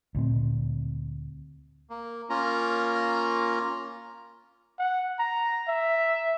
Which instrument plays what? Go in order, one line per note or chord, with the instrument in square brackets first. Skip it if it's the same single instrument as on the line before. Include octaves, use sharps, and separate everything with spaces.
[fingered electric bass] D2 A#2 C4
[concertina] A#3
A#3 C#4 F4 A#5
[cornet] F#5
A#5
E5